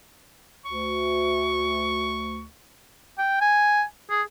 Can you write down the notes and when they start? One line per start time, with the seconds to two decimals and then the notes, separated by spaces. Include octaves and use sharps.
0.65 D2 C#6
3.19 G5
3.41 G#5
4.10 G#4